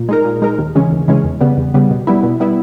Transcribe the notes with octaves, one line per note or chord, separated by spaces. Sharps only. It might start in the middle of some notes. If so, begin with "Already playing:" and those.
Already playing: A#2
G#3 D#4 A#4
A#2
G#3 D#4 A#4
D#2
C#3 E3 G#3 C#4
D#2
C#3 E3 G#3 C#4
E2
C#3 G3 B3
E2
C#3 G3 B3
B2
G3 B3 E4
B2
G3 B3 E4